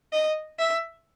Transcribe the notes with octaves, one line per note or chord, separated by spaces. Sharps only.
D#5
E5